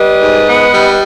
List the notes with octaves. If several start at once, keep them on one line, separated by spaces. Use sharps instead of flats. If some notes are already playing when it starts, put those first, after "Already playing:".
Already playing: G3 B4 D#5
G#2
B3
G3